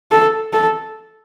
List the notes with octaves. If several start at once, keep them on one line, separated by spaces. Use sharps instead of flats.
A4
A4